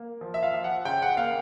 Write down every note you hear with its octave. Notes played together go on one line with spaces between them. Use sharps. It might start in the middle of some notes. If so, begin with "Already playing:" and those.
Already playing: A#3
F3
E5
F5
F3
F#5
C#3 G5
F#5
A#3 F5